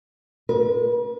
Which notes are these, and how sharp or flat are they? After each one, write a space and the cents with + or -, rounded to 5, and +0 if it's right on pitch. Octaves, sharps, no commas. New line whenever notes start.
B4 -45